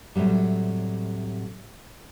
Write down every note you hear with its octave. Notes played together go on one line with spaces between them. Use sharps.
A2 C3 F#3 G3